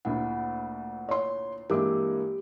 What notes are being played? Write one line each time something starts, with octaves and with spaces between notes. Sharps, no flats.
D2 A#2 E4 F#5
C#5 C6
G2 E3 G#3 A#3 G4 A#4 D6